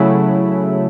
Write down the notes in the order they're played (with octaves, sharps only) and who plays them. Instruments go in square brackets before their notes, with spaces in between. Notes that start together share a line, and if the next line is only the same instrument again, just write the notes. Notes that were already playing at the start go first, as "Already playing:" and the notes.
Already playing: [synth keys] C#3 F#3 A3 E4